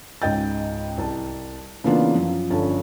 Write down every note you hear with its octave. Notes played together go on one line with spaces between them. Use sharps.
C#2 G#2 D#5 G5 G6 A6
C2 A5
C#3 E3 A#3 B3 D4 F4
F#2 F3
G1 D3 F3 C#4 A5